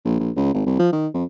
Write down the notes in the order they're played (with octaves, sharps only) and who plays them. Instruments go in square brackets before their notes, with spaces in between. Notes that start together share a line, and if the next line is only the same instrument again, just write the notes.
[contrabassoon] A#1
A#1
C#2
G#1
C2
F3
D#3
F2